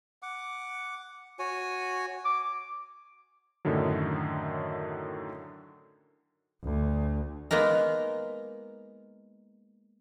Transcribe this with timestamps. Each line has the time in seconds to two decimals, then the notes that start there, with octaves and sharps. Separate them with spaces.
0.22 F#5 D6
1.39 F#4 C#5 G#5
2.25 D6
3.65 F#2 A2 D3 D#3 F#3
6.63 D2
7.51 G#3 A#3 B3 D#4 A#4